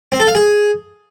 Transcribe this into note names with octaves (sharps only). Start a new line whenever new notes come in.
C4
A4
F5
G#4